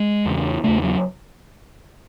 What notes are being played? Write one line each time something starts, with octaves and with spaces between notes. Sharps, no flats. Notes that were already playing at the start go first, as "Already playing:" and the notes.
Already playing: G#3
E2 C#3
E2 C#3 A3
F#3